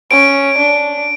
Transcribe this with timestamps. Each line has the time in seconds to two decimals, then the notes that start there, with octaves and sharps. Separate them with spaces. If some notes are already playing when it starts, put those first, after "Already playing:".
0.10 C#4 D7
0.58 D4